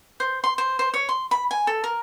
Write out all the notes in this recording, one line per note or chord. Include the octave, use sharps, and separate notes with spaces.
C5
C6
C5
C5
C#5
C6
B5
G#5
A4
A#4